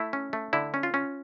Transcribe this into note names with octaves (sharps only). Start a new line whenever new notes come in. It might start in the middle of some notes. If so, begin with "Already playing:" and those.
Already playing: A3 E4
C#4
A3
D3 E4
C#4
F4
C#4